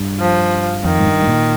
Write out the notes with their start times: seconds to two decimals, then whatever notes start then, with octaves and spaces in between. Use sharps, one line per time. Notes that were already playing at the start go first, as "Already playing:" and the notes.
Already playing: G2
0.20 F3
0.85 F2 D#3
0.99 G#2
1.07 G2
1.22 G#2
1.28 A#2